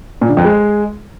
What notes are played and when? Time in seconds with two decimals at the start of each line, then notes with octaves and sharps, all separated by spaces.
0.21 A#2
0.29 D3
0.37 F2
0.45 G#3